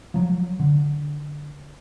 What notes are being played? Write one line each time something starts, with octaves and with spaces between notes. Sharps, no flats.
F3 F#3
D3